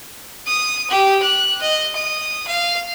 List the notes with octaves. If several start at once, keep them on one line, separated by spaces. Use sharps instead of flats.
D#6
G4
F#6
D#5
D#6
F5